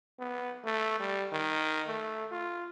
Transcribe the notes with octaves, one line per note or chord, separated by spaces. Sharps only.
B3
A3
G3
D#3
A3
F4